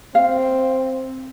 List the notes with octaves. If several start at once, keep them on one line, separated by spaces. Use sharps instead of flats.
C4 F5